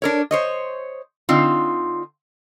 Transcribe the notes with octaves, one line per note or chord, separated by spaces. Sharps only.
D4 A#4 C#5
C5 C#5 D#5
D3 C4 D#4 F4